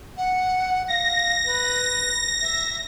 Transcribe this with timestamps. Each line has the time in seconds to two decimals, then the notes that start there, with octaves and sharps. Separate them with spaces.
0.17 F#5
0.88 F5 A#6
1.45 B4
2.41 E5